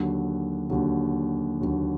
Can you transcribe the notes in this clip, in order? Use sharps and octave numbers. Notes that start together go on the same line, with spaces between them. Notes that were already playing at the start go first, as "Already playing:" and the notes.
Already playing: D#2 D3 F#3
D#2 D3 F#3
D#2 D3 F#3